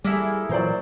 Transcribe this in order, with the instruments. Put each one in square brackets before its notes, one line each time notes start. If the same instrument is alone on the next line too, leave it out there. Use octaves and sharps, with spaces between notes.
[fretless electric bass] G3 [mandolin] A#3 E4 A4 [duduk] G#4
[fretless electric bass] A#2 E3 [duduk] F#3 [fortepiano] A#4 C5 D5